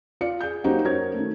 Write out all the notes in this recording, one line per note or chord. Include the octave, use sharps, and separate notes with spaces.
F4 D5 C#7
G#4 G6
F#3 A#3 D#4 F#4 G4 C5
F#2 F#4 A#4 C5 C#5 G#6
D#3 A3